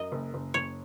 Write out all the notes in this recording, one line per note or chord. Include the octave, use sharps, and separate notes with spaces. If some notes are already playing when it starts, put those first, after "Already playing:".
Already playing: F#2 D#5
F#1
F#1
F#1 C#5